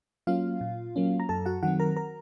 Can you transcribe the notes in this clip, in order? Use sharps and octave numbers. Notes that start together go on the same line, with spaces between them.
F#3 A#3 C#4 F4 F5
A#2
F#3 A#3 C#4
A#5
F#2 A4 A5
F#4 F#5
D#3 F#3 C4 F#4 F#5
A#4 A#5
A#4 A#5